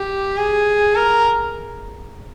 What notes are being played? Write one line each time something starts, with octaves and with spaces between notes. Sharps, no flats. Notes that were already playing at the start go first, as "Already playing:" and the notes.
Already playing: G4
G#4
A#4